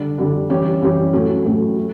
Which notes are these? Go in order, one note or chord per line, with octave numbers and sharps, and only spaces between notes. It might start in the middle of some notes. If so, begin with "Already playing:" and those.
Already playing: D3 G3 D4
D3 G3 D4
E3 G3 C#4 G4 C#5
E3 G3 C#4 G4 C#5
A2 F#3 A3 C#4
A2 F#3 A3 C#4
A3